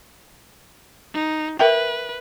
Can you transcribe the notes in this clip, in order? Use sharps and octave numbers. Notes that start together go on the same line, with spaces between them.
D#4
A#4 B4 E5 G5